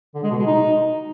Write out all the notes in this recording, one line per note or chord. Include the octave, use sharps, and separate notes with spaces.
D3
G#3
B2
G#3
D#4